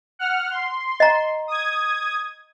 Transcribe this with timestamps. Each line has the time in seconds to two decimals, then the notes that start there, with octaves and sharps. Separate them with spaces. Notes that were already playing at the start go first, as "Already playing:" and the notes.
0.19 F#5 F6
0.51 C6
1.00 D#5 A#5
1.48 D#6 G#6